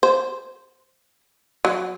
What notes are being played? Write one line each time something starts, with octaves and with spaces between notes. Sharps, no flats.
C5
F#3